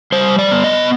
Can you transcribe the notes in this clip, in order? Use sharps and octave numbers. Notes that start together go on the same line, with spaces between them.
G3 C5
D5
B3
D#5